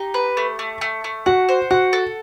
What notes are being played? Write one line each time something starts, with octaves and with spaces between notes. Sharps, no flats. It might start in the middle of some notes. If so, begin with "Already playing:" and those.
Already playing: D#4 G4
B4
A3
A3
A3
A3
F#4 F#5
C5
F#4 F#5
A4